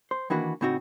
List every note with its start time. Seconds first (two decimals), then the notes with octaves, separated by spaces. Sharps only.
0.11 C5
0.30 D#3 E3 A#3 D4 F#4 B4
0.61 A2 C#3 C4 D#4 F#4